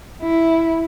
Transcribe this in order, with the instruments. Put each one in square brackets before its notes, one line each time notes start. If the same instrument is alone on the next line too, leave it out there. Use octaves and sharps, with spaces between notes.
[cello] E4